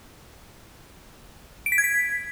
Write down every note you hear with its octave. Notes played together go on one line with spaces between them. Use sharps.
D7
B6
G#6
B6